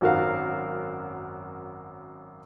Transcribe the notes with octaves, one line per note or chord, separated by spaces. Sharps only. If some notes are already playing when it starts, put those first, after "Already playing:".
G#1 F#2 F#4 A#4 F5